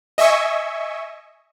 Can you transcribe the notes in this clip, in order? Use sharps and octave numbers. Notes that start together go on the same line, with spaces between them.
D#5 E5 G#5 C#6 D#6